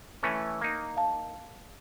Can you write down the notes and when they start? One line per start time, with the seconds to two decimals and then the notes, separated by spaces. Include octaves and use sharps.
0.23 E3 A3 C#4
0.61 A#3 D#4
0.97 F5 A5